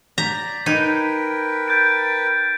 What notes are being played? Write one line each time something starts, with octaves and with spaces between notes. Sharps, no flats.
D5 A#5 G6 B6
D#4 A#4 B4 G5 G#6
G6 A6 D7